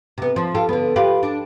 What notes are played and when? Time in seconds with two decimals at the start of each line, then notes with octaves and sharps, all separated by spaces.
0.18 C3 B3
0.36 F3
0.55 F4 G4 A4
0.69 D3 B3
0.96 F4 G4 B4
1.23 D4